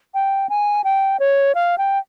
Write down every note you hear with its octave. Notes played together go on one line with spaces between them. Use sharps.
G5
G#5
G5
C#5
F5
G5